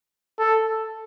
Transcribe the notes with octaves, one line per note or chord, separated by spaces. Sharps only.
A4